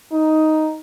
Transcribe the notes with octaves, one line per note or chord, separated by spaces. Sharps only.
D#4